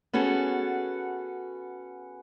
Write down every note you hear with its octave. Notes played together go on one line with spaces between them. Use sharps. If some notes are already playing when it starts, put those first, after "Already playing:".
B3 C#4 F#4 G#4 A4